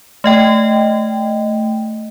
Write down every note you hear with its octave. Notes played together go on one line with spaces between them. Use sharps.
A3 D#5 G5